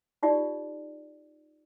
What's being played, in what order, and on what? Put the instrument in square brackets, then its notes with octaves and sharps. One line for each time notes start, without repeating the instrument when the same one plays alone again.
[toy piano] D#4 F4 G4 D5